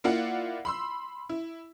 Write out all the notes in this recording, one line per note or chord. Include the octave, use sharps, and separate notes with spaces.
A#3 E4 F4 D5 F5 F#5
B5 C6 E6
E4